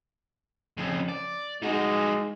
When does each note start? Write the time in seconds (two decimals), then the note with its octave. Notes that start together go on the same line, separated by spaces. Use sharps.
0.78 F2 C#3
1.09 D5
1.62 G#3 D#4 F#4